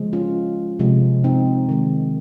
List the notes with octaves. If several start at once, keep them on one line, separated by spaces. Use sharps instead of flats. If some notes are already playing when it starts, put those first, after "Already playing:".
Already playing: C#3 F3 G#3
C#4 F4
C3 F3 G#3
C4 D#4
D#3 G#3